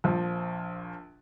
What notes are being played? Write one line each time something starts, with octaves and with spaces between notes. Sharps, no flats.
A#1 F3